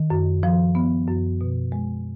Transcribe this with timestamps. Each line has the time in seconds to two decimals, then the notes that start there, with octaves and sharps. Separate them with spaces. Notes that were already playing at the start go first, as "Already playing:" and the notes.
Already playing: D#3
0.10 F#2
0.43 F3
0.75 B3
1.08 F#2
1.41 B2
1.72 G#3